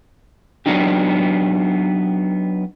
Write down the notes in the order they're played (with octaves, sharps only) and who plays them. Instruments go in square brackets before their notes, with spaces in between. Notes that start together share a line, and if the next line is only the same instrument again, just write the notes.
[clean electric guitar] F#3 G#3 B3 D4 D#4 G4